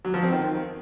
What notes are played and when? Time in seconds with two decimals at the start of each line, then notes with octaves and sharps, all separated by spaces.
0.05 F#3
0.14 F3
0.23 C4
0.32 D#3